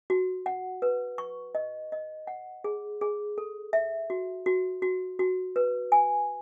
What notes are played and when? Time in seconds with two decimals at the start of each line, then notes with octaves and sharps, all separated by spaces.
0.10 F#4
0.46 F#5
0.82 B4
1.18 C#6
1.55 D#5
1.92 D#5
2.27 F#5
2.64 G#4
3.01 G#4
3.38 A4
3.73 E5
4.10 F#4
4.46 F#4
4.82 F#4
5.19 F#4
5.56 B4
5.92 G#5